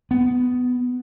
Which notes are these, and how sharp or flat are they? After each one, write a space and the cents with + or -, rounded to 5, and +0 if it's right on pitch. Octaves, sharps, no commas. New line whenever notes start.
B3 +10